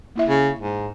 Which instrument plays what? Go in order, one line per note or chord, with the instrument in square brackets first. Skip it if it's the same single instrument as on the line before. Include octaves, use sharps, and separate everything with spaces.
[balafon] A#3 E4 E5
[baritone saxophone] C#3
G#2